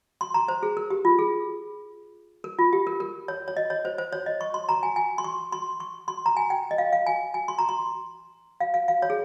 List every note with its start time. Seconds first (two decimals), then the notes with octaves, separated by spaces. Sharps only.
0.21 C6
0.34 A#5
0.48 C5
0.63 G#4
0.77 A#4
0.90 G4
1.05 F4
1.19 G#4
2.44 A#4
2.59 F4
2.73 G4
2.87 A#4
3.00 A#4
3.28 C#5
3.48 C#5
3.57 D#5
3.70 C#5
3.85 C5
3.98 C5
4.12 C#5
4.26 D#5
4.41 C#6
4.54 C6
4.69 A#5
4.83 G#5
4.96 G#5
5.18 C6
5.24 C#6
5.52 C6
5.80 C#6
6.08 C6
6.26 A#5
6.37 G#5
6.50 G5
6.71 D#5
6.78 F5
6.93 F5
7.06 G#5
7.34 G#5
7.48 C6
7.59 A#5
7.69 C6
8.60 F5
8.74 F5
8.88 F5
9.02 C#5
9.10 G#4